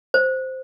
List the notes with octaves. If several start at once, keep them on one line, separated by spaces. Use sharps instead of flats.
C5